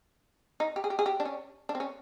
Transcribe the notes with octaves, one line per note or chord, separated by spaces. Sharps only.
D#4
G4
G#4
G4
G#4
G4
D4
C#4
D4
C4
C#4